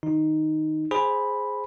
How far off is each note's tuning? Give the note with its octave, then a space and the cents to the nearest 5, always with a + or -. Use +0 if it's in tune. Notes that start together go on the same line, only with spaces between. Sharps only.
D#3 +0 D#4 +0
G#4 +0 C5 +0 B5 -5